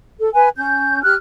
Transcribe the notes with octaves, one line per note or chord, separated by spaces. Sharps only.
A4
B4 G#5
C#4 G6
G4 F6 F#6